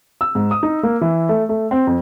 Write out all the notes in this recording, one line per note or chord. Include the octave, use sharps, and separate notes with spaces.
E6
G#2
D#6
D#4
A#3
E3
A3
A3
C4
F2